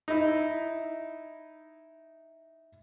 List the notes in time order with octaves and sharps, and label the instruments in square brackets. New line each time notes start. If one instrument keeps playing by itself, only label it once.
[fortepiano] D#4 E4